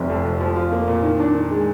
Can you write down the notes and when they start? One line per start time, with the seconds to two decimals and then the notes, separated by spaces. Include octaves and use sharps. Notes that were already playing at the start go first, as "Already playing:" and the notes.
Already playing: F1 C3
0.09 F2
0.25 F1
0.40 F3
0.56 F4
0.72 A#3
0.88 A#2
1.03 D#3
1.20 D4
1.35 D#3
1.51 G#3